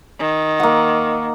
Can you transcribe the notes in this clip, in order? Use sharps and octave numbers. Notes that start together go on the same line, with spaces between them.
D#3
A#3 F#5